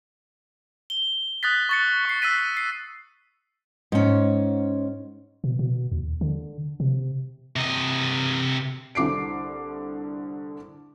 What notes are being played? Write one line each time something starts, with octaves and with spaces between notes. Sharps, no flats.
G7
D#6 F#6 A6 B6
C#6 A6 C#7
C#6 C7
E6 A6 B6 D#7
C7
G#2 C#4
B2
B2
D#2
D3
C3
C3 D#5
C2 D3 D6 C7 D7